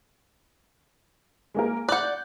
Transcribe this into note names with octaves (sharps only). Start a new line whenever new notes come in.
G#3 A#3 A#4
D5 F#5 F#6 G6